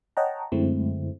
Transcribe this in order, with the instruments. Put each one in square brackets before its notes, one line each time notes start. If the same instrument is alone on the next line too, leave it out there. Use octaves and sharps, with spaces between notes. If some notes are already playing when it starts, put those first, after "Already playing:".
[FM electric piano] C#5 D#5 F#5 G5 A5 A#5
F#2 D3 G#3 A3 C4 E4